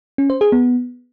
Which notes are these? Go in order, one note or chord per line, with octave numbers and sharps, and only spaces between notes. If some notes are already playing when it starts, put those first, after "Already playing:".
C#4
C5
G#4
B3